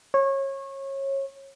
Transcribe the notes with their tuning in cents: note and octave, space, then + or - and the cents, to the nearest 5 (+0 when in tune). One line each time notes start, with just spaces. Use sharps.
C#5 -25